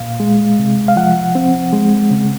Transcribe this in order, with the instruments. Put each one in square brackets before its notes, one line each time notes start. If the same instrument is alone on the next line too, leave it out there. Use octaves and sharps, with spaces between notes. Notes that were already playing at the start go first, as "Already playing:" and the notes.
Already playing: [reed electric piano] A#2 F5
G#3
C3
F5
F3 F#5
C4
G#3
C#3